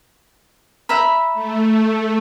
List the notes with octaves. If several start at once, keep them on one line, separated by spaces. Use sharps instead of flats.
E5 A#5 B5
A3